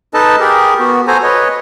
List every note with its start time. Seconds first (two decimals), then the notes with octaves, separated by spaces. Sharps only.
0.14 D#4 A4 B4 D#5 A5
0.40 G4 G#4 A#4
0.79 B3 F#4
1.07 F#4 A4 C5 G#5 A#5
1.23 B4 C#5 D#5